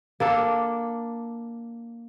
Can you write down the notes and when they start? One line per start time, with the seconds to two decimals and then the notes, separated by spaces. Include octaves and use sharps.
0.20 A#3 D4 A4